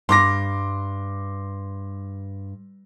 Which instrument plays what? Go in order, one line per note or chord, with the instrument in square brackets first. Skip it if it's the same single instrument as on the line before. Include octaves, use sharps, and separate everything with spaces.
[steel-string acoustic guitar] G2 [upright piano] C6 D6 A#6